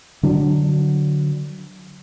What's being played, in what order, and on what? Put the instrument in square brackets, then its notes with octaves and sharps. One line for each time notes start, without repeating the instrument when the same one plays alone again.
[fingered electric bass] D3 F#3 G3 D4